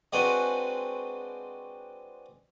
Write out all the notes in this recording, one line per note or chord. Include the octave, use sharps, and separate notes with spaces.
G#3 C4 D4 F#4 B4 G#5